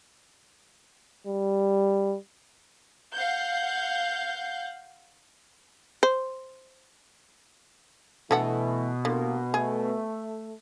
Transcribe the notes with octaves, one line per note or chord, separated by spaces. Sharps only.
G3
F5 F#5 G6
C5
B2 D3 E3 A3 A4 F#5
C2 D3 A#3
A3 G#4